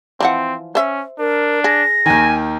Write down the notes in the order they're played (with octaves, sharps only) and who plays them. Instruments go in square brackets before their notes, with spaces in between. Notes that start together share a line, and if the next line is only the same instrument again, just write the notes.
[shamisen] E3 F3 F#5 [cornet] C4
[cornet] C#4 [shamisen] C5 E5
[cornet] D4 [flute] A#4
[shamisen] G#4 [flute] A#6
[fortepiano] D#2 D#3 [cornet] G#5